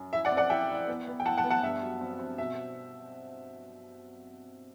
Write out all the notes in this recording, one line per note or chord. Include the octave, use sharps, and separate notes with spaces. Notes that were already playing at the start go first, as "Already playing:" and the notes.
Already playing: F#2
E4 E5
D5 F#5
C4
D5 F#5
E4 E5 G5
E4
B3
B3
G5
E4 F#5 A5
F#5 A5
B3
F#5 A5
G2 E5
F#3
C4
C4
B2 E5